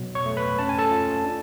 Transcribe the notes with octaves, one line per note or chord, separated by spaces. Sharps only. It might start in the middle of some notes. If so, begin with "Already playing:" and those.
Already playing: B2 F#3
C#5 C#6
A3
B4 B5
C#4 A5
G#5
A4 A5
F4
D4